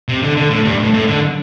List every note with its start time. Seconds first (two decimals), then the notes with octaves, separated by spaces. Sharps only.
0.09 C3
0.22 D3
0.37 D3
0.50 A2
0.65 G2
0.79 A2
0.94 A2
1.08 D3